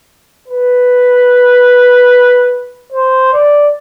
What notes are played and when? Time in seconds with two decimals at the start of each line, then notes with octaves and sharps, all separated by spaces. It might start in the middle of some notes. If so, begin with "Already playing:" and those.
0.48 B4
2.92 C5
3.33 D5